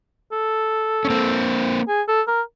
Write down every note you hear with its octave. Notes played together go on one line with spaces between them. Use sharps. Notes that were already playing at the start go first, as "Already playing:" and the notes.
A4
C#4
A#3 C4
G#4
A4
A#4